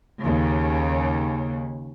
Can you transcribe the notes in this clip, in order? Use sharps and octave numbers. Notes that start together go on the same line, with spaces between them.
D#2 C#3